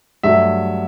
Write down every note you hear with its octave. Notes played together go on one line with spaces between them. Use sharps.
G2 F#3 A3 E5